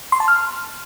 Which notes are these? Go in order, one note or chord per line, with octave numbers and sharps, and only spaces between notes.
C6
A5
F6